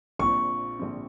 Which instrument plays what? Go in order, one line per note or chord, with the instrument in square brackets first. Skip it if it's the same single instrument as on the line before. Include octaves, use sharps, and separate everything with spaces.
[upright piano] A#1 A#2 F3 C4 [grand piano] C#6
[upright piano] A#1 A#2 F3 C4